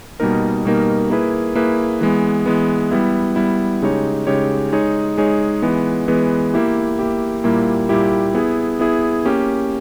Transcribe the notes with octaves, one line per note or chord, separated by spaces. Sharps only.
B2 G3 A#3 D#4 A#4
B2 G3 A#3 D#4 A#4
A#3 E4 G#4 B4
A#3 E4 G#4 B4
E3 G#3 B3
E3 G#3 B3
G3 B3 E4
G3 B3 E4
C#3 G#3 D#4 G4 C#5
C#3 G#3 D#4 G4 C#5
G#3 D#4 G#4 C#5
G#3 D#4 G#4 C#5
E3 G#3 B3
E3 G#3 B3
A#3 E4 G4
A#3 E4 G4
A#2 G3 A#3 E4 G4
A#2 G3 A#3 E4 G4
B3 E4 G#4
B3 E4 G#4
A#3 C#4 G4